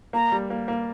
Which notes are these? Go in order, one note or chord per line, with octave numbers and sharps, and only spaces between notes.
A#3 A#5
G3
A#3
A#3